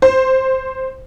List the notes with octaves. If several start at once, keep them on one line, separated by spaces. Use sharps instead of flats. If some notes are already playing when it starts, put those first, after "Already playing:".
C5